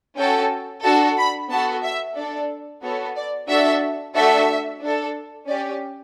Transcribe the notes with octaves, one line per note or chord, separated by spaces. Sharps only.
C#4 F#4 A4 G5
D4 F#4 A4 A5
B5
B3 F#4 A4 A5
E5
D4 A4 D5
B3 F#4 A4 C#5
D5
D4 F#4 A4 E5
A3 D4 F#4 A4 E5
D4 A4
C#4 G4 D5